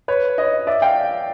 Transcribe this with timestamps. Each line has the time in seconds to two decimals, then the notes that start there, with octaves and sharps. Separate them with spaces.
0.08 B4 C#5
0.38 C#5 D#5
0.67 D5 E5
0.82 F5 G5